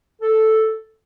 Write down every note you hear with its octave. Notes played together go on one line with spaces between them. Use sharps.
A4